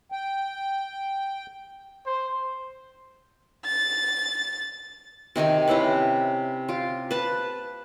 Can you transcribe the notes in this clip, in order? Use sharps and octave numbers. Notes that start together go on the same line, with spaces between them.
G5
C5
A6
C3 D#3 G4 G#5
C3 C#4 E4 B4
F4 G4
B4 A5